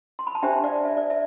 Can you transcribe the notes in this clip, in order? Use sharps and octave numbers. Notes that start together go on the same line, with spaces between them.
C6
B5
A5
D4 G4 C5 E5 G5
D5 F5
E5
D5
E5